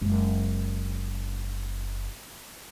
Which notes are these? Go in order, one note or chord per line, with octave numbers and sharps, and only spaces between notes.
F#1 G#3